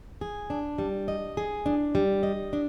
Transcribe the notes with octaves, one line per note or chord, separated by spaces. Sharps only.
G#4
D4
G3
D#5
G#4
D4
G3
D#5
D4